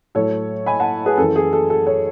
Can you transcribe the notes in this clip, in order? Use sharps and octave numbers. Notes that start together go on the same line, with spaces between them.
A2 F#3 A4 C#5
G#5 B5
F#5 A5
G#4 B4
F#2 E3 A4
G#4
A4
A4
A4 C#5